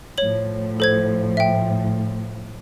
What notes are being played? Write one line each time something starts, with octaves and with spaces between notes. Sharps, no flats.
A2 F3 C#5 F#7
A4 C5 G#6
E5 G5